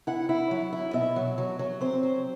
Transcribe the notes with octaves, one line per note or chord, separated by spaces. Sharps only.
E4 F#5
E4
F#3
E4
B2 E5
F#3
F#3
F#3
C4 C5
F#3